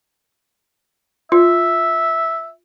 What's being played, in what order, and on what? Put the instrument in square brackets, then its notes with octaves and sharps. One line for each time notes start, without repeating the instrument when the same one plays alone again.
[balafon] F4 [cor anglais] E5